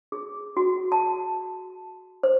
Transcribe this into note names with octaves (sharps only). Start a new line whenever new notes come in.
G#4
F#4
A5
C5